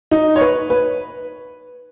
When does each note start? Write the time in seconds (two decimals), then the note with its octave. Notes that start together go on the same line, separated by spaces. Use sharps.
0.11 D#4
0.36 C#5
0.41 B4
0.70 B4